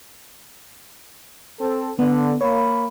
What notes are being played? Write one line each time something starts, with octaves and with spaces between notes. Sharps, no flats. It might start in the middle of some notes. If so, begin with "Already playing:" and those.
C4 A4
D3 B3
A#3 C#5 B5